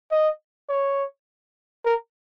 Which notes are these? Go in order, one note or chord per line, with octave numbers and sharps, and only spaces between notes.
D#5
C#5
A#4